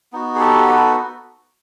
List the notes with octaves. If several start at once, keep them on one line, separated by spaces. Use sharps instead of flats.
B3 D#4 F#4
G#4
G4 A4
A4 B4